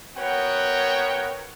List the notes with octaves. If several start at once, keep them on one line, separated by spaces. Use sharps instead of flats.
B3 F#4 A#4 C#5 F#5 G5